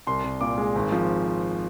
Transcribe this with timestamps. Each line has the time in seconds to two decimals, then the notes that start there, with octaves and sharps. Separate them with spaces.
0.07 C2 C6
0.24 C2
0.41 A#2 D6
0.58 G#3
0.76 G#1
0.92 F3